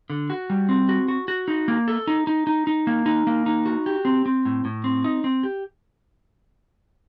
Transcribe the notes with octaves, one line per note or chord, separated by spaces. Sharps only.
D3
F#4
G3
C4
F#4
F#4
F#4
D#4
A#3
A4
D#4
D#4
D#4
D#4
A#3
D#4
A#3
D#4
F#4
G4
C4
C4
A2
A2
C4
D#4
C4
G4